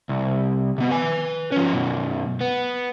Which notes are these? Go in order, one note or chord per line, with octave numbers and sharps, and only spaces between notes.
C2
C3 B3
B4 G#5
F3 C#4
F#2 B2
B3